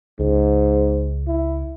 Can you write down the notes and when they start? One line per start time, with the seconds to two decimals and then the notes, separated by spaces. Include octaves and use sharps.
0.19 C#2 G#2
1.27 E4